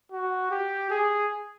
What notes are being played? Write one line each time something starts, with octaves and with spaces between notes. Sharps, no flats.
F#4
G4
G#4